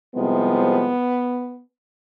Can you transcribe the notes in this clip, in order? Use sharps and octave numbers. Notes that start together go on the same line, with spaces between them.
C2 C3 F3 G#3 B3